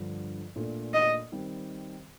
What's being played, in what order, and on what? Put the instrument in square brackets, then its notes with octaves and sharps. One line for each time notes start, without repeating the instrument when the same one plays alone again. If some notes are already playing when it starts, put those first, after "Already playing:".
Already playing: [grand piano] G2 D3 F3
A#2 A3 D4
[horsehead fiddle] D#5
[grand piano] D#3 G3 C4